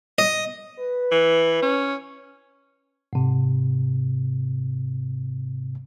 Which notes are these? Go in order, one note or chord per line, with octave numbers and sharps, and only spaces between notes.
D#5
B4
E3
C#4
G#2 C3